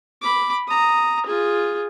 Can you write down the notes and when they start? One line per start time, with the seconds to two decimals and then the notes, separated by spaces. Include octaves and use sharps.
0.22 B5 D6
0.67 A#5 D#6
1.26 F4 G#4